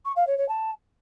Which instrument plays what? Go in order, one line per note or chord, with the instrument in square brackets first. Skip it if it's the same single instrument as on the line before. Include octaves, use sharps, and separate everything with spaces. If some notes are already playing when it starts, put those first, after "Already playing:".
[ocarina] C#6
F5
C#5
C#5
A5